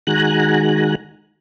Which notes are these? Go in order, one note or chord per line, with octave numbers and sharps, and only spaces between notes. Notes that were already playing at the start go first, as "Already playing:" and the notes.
D#3 G#3 F#4 G#5 A#5 F#6